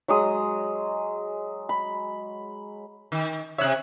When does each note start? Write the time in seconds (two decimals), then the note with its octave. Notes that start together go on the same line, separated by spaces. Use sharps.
0.08 F#3 G#3 D#6
1.69 B5
3.12 D#3
3.58 C3 E3 C#5 E5 E6 F#6